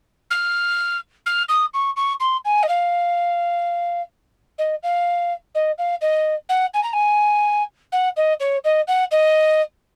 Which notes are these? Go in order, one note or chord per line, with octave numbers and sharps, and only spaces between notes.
F6
F6
D#6
C#6
C#6
C6
G#5
D#5
F5
D#5
F5
D#5
F5
D#5
F#5
G#5
A#5
G#5
F#5
D#5
C#5
D#5
F#5
D#5